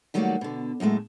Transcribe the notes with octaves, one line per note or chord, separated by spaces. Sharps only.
D#3 F#3 G3 A3 A#3 F#4
B2 D3
F#2 A2 G#3 A3